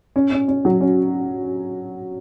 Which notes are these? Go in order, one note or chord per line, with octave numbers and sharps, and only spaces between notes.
C#4
C#4
C#4
F#3
C#4